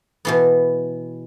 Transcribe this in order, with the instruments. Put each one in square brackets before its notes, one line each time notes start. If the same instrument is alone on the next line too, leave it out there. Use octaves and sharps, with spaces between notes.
[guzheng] B2 E3 B3